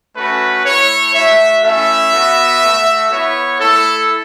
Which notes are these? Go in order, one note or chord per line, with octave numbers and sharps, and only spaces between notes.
A3 C#4 F#4 B4
A3 E4 C#5
A3 F#4 E5
A3 C#4 E4 E5
B3 F#4
A3 F#4
B3 E4 C#5
A3 E4 A4